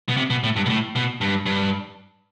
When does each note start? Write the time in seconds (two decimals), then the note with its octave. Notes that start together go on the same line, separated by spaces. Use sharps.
0.09 B2
0.17 C3
0.30 B2
0.44 A2
0.56 G2
0.66 B2
0.70 A2
0.95 B2
1.21 G2
1.46 G2